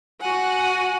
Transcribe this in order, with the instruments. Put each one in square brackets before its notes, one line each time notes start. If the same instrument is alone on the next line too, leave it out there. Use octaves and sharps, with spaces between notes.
[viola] F#4 F#5 [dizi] G#5